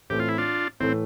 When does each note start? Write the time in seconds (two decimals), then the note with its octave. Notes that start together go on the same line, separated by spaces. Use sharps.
0.10 A2 E3 A3 C4 G4
0.20 F4
0.28 E4
0.38 D4 F4
0.80 A2 E3 A3 C4